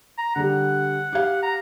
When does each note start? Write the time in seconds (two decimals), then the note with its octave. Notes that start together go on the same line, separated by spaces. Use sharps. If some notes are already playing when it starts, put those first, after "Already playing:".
0.18 A#5
0.36 D3 G3 F#5
1.13 G4 F5
1.43 A#5